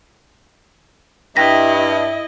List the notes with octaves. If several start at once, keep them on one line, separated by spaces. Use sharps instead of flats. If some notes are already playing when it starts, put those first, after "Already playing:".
G2 E4 D#5 E5 G5 A#6 B6